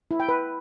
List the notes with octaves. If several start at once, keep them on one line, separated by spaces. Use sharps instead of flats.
E4
G5
B4